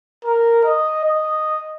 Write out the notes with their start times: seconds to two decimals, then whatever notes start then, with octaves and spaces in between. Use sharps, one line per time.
0.25 A#4
0.65 D#5
1.05 D#5